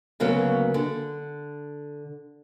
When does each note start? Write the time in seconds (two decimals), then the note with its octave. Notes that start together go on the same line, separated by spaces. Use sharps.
0.20 D2 C#3 F#3 A#3 B3
0.74 D3